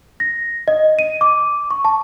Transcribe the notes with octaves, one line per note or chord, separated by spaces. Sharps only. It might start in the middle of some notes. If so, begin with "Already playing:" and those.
A#6
D#5
D#7
D6
C#6
A5